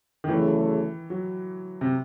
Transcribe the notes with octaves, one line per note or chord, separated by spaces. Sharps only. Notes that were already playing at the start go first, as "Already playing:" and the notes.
D#3
E2 C#3 E3 F#3 A3
F#3
C3